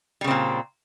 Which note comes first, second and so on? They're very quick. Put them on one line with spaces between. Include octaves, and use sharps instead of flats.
G3 C#3 C4 A#2